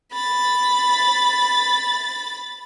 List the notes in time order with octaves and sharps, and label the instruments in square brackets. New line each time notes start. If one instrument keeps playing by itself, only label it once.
[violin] B5 A6